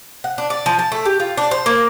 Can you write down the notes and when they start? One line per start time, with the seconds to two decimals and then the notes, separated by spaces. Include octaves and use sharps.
0.24 F#5
0.38 D4
0.50 D5
0.66 F3
0.79 A5
0.92 A3
1.05 G4
1.20 F4
1.37 D4
1.51 C5
1.66 A#3